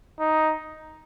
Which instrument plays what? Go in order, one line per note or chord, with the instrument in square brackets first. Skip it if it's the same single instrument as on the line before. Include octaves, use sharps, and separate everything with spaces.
[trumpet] D#4